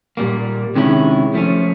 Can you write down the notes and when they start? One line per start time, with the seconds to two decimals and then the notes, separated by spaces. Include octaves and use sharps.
0.17 A#2 G3 A#3
0.75 C3 D#3 G#3 C#4 E4
1.34 F3 A3 C#4